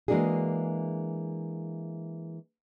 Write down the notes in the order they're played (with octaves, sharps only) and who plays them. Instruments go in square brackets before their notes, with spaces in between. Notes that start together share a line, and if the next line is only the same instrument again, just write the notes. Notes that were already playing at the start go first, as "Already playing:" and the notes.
[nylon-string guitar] E3 G#3 A#3 D4 F#4 G#4